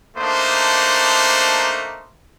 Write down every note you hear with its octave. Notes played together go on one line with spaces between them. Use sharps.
A3 A#3 D4 D#4 C5